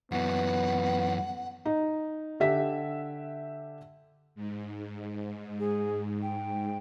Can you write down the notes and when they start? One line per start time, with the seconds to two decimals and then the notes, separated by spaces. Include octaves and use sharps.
0.12 F#2 E3 B3 F#5
1.65 D#4
2.40 D3 G4 E5 B6
4.35 G#2
5.59 G#4
6.22 G5